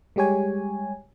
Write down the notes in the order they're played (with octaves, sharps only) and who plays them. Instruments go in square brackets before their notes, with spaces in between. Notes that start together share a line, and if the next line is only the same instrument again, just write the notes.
[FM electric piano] G3 G#3 G4 C#5 G#5